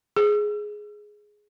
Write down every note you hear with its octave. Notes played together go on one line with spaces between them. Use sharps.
G#4